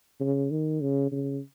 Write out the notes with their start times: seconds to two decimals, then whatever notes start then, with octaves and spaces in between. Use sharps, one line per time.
0.20 C#3
0.51 D#3
0.81 C#3
1.12 C#3